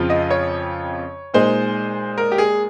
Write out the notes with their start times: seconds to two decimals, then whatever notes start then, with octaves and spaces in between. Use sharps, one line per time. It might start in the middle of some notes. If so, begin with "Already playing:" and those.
Already playing: F2 C#3 F3 C4 F4
0.10 D#5
0.30 C#5
1.34 A#2 G#3 D#4 C5
2.18 A#4
2.32 G4
2.38 G#4